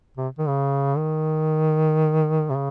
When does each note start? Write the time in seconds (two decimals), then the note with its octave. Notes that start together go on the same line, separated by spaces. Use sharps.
0.18 C3
0.38 D#3
0.48 C#3
0.97 D#3
2.50 C3
2.55 C#3